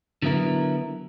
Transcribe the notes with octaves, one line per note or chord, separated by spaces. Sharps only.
D3 F#3 B3 E4 A#4